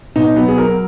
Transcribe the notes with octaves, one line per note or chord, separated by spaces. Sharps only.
B2 D#4
F#3 B3
G#4
F#3 A#4